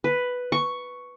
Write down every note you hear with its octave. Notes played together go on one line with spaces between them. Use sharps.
B4
C#6